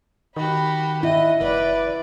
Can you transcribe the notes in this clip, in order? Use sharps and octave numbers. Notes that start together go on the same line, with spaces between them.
D#3 F#4 G4 B5
E4 F#4 D#5
F#1 B4 D5